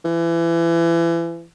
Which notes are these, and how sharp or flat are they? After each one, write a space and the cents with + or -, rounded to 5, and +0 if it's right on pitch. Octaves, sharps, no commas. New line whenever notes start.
E3 +30